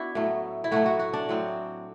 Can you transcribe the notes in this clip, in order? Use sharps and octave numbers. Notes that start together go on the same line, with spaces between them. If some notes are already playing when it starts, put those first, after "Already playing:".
Already playing: B3 D4 E4 F#4
A2 F#3 A3
E4
A2 F#3 A3 F#4
F#4
F#4
D4
A2 F#3 C4